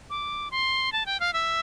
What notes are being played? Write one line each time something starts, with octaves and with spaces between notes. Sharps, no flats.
D6
C6
A5
G5
F5
E5